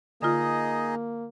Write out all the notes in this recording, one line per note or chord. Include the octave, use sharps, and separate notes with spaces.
D3 A#3 D#4 F4 G#4 D#5